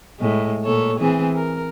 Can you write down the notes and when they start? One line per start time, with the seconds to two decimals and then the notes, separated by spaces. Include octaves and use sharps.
0.19 A2 G#3
0.64 A#2 A4 C#5
1.00 E3 C4 G#4
1.35 A#4